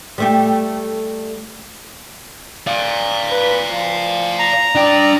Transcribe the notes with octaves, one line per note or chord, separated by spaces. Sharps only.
G3 A3 G4
D5 F5
B4
F3
A#5
D4 D5 G5